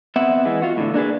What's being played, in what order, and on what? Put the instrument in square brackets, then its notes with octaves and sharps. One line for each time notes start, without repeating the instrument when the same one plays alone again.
[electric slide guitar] B3 C4 E5 F#5
E3 G#3 B3
F4 F#4
A2 D3
A#3 D4 G#4 B4